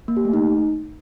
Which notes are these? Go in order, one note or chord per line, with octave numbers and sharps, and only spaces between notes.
A#3
G4
A3
D#4